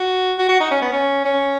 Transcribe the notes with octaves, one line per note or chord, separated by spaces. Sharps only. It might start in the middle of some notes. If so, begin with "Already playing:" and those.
Already playing: F#4
F#4
F#4
D#4
C#4
B3
C#4
C#4